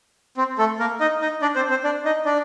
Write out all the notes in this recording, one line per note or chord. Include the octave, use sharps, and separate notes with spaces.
C4
A3 A4
A#3 A#4
D#4 D#5
D#4 D#5
D4 D5
C4 C5
C4 C5
D4 D5
D#4 D#5
D4 D5